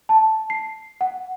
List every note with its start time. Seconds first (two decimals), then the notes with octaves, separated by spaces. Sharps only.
0.09 A5
0.50 C7
1.01 F#5